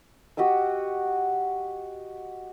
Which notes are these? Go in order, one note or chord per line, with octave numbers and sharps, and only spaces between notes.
F#4 G4 D#5 E6